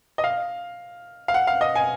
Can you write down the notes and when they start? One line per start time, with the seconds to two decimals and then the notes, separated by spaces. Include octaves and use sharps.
0.18 D#5
0.24 F5
1.28 F5
1.34 F#5
1.47 F5
1.61 D#5
1.76 G#5